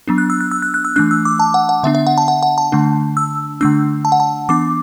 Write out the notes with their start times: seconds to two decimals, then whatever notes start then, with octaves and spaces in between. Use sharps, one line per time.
0.08 F#3 B3 D4
0.18 F#6
0.30 E6
0.41 F#6
0.51 E6
0.62 F#6
0.74 F#6
0.85 E6
0.96 E3 A3 D4 F#6
1.11 E6
1.25 D6
1.39 A5
1.54 F#5
1.69 F#5
1.83 D3 B3 D4 E5
1.95 E5
2.07 F#5
2.18 A5
2.28 F#5
2.43 F#5
2.58 A5
2.72 D3 A3 D4
3.17 E6
3.61 D3 A3 D4 E6
4.05 A5
4.12 F#5
4.20 A5
4.49 E3 B3 D4 D6